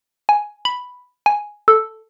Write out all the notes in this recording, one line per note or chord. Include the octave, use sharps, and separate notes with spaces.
G#5
B5
G#5
A4